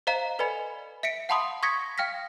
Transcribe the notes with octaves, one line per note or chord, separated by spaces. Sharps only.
C5 D#5 F5 A#5
A4 B4 D5 D#5 G#5 B5
E5 B6 C#7 D7
F5 F#5 A5 B5 C6 D#6
C#6 D#6 G#6 A#6 B6 C#7
F5 G5 F6 A#6 B6